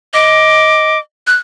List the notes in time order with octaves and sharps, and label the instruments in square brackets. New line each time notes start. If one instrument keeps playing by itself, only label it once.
[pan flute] D#5 [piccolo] D6
[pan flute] F#6